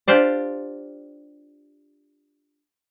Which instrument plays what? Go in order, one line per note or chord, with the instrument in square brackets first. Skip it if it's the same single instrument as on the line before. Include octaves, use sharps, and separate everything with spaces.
[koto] D4 F4 G4 C5 D5